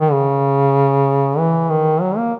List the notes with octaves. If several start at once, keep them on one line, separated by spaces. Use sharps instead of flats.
D#3
C#3
E3
D#3
F#3
A#3